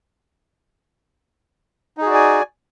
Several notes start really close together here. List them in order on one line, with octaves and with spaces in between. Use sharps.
D#4 G#4 F#4 D5 G#5